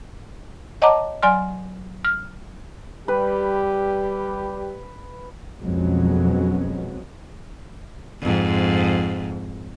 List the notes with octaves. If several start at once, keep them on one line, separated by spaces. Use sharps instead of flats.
C#5 D#5 F#5 A5 A#5 D6
F#3 D5 G#5 C6 F6
F6
G3 G4 B4
B1 F2 F#3 G#3 B3 C#4
F2 G#2